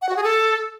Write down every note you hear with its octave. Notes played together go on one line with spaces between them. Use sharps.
F#5
F#4
G#4
A4